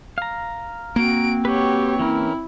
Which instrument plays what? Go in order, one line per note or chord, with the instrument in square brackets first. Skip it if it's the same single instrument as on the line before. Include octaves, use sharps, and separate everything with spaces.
[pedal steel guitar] F5 A#5
[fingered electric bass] A#3 [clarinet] C4 [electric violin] F#4 D7
[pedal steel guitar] F#4 B4 [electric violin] G4 C#5
[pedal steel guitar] E3 C#4 A#4 [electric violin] E4